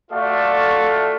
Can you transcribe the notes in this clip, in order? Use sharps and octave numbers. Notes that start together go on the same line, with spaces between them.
A3 F4 F#4 A4 D5 F5